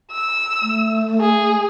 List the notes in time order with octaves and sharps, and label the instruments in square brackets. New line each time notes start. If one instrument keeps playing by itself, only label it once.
[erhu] E6
[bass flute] A3
[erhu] G#4